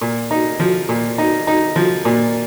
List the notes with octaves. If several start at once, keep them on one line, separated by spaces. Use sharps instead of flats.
A#2
D#4
F3
A#2
D#4
D#4
F3
A#2